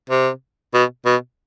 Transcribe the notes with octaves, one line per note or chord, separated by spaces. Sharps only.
C3
B2
B2